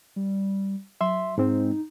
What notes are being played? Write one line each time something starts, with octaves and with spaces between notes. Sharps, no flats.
G3
F#3 E5 C6
G#2 G#3 C4 D#4